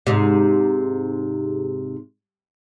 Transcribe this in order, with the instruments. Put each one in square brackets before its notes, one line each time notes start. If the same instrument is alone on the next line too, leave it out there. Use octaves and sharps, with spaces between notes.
[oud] G#2 C3